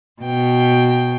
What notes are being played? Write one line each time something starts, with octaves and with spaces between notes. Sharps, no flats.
B2 G5